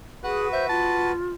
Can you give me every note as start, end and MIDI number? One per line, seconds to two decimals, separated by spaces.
0.24 1.12 66
0.24 0.48 68
0.24 1.12 71
0.24 0.45 78
0.53 0.65 72
0.53 0.69 76
0.69 1.33 65
0.69 1.11 81